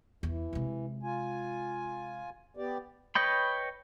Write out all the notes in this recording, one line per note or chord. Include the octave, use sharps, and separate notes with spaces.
E2 E3
C3 G#3
F4 G#5
B3 G4 D5
B4 C#5 D#5 G5 B5